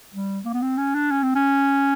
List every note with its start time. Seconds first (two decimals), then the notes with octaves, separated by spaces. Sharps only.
0.14 G3
0.45 A#3
0.53 B3
0.62 C4
0.78 C#4
0.95 D4
1.11 C#4
1.23 C4
1.35 C#4